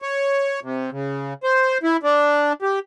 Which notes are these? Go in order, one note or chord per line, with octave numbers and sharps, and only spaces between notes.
C#5
C3
C#3
C5
E4
D4
G4